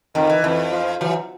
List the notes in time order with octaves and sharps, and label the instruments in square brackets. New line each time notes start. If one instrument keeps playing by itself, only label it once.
[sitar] F2 [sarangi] D#3
[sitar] E3
[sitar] F2 [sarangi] E3
[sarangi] F3
[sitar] E3 [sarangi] F#3